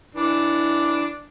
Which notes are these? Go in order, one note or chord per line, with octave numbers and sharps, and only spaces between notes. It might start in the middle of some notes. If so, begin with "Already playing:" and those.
E3 D4